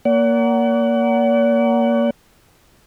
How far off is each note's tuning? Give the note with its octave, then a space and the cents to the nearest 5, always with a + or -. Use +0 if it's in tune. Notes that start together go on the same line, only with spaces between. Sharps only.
A#3 +0 D5 -45 F#5 +15